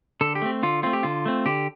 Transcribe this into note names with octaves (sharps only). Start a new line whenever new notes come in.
D3 A4
G4
A3 C4
D3 F4
A3 C4 F4
G4
D3 F4
A3 C4
D3 G4